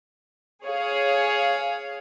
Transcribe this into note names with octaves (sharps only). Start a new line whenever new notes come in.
G#4 C#5 F5